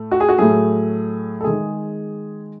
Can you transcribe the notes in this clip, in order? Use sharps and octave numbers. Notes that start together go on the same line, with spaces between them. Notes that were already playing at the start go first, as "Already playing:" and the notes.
Already playing: A2 A3
F#4
G#4
F#4
A2 F#3 A3 G#4
A4
D#3 G#3 G#4